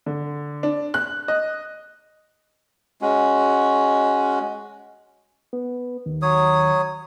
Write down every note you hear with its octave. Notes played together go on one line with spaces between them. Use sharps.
D3
D4
F#6
D#5
G#3 C#4 F#4
B3
D#2
F#3 C#5 D#6